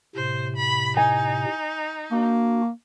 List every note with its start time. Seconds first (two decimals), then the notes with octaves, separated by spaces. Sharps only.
0.16 A2 C3 C5
0.56 B5
0.97 D#4 G#5
2.11 A#3 D4 F#4